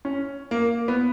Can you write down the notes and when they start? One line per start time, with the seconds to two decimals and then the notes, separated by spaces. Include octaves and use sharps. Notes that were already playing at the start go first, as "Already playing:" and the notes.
0.05 C#4
0.51 A#3
0.88 B3